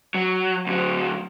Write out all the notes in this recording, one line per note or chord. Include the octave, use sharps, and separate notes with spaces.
F#3
D2 F#3